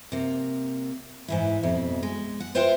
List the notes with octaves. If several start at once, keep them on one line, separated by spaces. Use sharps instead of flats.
C3 A#3
G#2 E3 E4
F2 B2 E4
G#3
F#5
F4 B4 C5 E5 F#5 G5